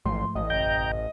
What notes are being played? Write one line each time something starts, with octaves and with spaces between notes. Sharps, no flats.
A1 G#2 F3 A3 C6
A1 D#5
F#1 G5 A#5 G6